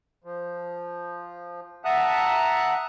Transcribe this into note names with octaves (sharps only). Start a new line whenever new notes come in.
F3
E5 F#5 A5 A#5 D#6 F#6